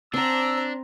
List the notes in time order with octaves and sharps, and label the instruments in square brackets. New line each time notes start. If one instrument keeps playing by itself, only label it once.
[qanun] C4 F#5 [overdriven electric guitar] D4 [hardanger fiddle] C5 A#5 [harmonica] E6